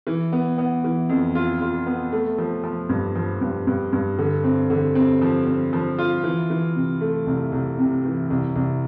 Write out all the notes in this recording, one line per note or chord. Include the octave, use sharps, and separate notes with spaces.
E3
B3
B3
E3
F2
F4
F4
B3
A3
F3
F3
G2
F3
G2
G2
G2
D3
C4
D3
C4
F3
C4
F3
F4
E3
E3
C3
A3
C2
C2
C3
E3
C2
C2